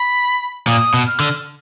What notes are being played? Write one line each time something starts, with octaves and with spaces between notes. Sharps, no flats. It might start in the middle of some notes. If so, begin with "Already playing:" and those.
Already playing: B5
A#2 D#6
B2
F6
D3